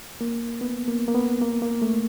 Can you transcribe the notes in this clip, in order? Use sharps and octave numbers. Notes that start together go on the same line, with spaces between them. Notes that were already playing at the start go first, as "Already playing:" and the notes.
A#3
B3
A#3
A#3
B3
A#3
A#3
A3